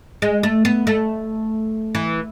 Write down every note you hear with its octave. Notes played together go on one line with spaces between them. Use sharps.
G#3
A3
B3
A3
E3